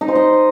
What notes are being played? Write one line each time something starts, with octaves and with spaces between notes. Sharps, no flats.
D#4
C5
D#5